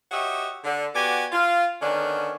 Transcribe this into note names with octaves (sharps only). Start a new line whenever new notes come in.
F#4 G4 C#5 D#5 E5
D3
B3 F#4 G4 D5 G#5
F4
D3 D#3 B3 C#4 D4